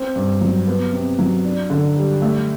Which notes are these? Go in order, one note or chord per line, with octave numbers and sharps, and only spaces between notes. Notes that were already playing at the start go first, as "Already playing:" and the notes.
Already playing: C4
G2
F#3
B3
C3
F#3
D4
D3
G3
A3